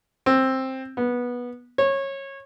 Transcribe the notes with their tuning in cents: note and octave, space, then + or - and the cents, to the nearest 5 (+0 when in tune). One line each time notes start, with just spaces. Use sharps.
C4 +10
B3 -15
C#5 -20